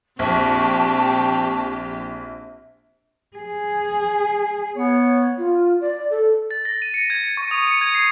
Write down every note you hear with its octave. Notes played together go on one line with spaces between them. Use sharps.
A#1 C4 G4 G5 A5 C#6
G#4
B3 C#5
F4
D5
A4
A6
A#6
D#7
C#7
G#6
C#7
C#6
D#6
C#7
G#6
C7